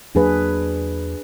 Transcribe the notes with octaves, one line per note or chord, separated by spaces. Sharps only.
E2 F#3 A#3 D4 G#4 B4